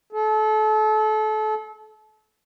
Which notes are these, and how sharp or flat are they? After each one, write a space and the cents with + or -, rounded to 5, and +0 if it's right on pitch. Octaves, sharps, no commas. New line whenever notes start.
A4 -30